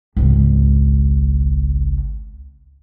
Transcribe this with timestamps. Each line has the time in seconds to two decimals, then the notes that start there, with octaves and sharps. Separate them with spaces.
0.17 G#1 C#2